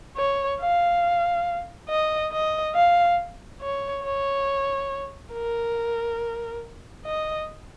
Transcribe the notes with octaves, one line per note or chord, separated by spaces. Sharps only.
C#5
F5
D#5
D#5
F5
C#5
C#5
A#4
D#5